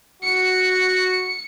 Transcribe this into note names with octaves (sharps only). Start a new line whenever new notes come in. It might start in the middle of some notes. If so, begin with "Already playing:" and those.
F#4 C#7